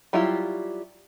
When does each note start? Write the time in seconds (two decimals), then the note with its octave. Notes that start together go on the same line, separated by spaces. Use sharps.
0.13 F#3 G3 E4 F4 G4